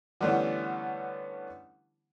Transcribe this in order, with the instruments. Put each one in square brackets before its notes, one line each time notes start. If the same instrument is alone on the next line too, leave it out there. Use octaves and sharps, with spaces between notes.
[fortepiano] D3 E3 G3 A3 B3 C#4